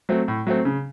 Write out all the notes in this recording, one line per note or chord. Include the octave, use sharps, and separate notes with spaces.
F#3 A3 C4
A2
F#3 A3 C4
C#3